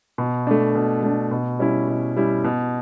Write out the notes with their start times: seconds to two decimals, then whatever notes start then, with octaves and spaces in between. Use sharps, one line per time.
0.18 B2
0.47 A3 D4
0.75 B2
1.03 A3 D4
1.31 B2
1.59 G3 C#4 E4
1.88 B2
2.16 G3 C#4 E4
2.44 B2